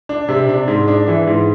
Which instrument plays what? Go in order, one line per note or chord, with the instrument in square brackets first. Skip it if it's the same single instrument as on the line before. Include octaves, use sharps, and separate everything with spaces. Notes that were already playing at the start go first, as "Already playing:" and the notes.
[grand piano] D4
C3
D4
G#2
D4
E3
G#2